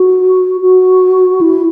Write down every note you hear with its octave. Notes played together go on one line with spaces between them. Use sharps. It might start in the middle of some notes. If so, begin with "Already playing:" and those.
Already playing: F#4
F#4
E4